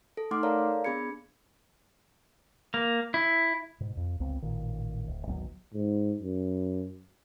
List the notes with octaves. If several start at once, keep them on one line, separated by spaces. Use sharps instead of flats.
A4
A3 D#4 F#5 C6 D6 F6
A4 A#4 C#5 D5 F5 A#5
B3 D4 G#4 B5 G#6 C#7
A#3
E4
G#2 B2
F2
G1 C#2 B3 C4
A1 A#2 D#3
D1
G#1 D2 F#3 B3
G#2
F#2